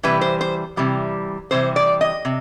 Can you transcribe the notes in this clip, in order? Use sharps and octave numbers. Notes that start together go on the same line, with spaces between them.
C3 E3 G3 B4
C5
C5
C3 E3 G3
C3 E3 G3 C5
D5
D#5
C3